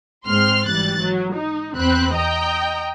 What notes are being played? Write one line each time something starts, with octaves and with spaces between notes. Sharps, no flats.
G#2 G#3 C4 C6 F6
G#1 E3 G3 F#6 A6
F#3
D#4
E2 C4 B5 F#6
D#5 G5 A#5